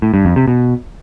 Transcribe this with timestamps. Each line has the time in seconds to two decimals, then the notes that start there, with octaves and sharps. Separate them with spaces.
0.02 A2
0.14 G2
0.25 F2
0.36 C3
0.48 B2